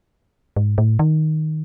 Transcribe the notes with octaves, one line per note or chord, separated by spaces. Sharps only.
G#2
A2
D#3